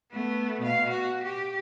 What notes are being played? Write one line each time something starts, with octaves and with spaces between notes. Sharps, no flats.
A3 B3
B2 F5
F#4
G4